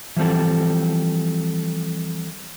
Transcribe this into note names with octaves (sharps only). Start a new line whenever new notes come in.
E3 F3 G3 C4 A4